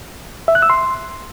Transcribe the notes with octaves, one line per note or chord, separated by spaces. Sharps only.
E5
F#6
E6
C6